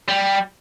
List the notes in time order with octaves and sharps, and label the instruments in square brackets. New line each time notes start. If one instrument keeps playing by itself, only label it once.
[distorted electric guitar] G3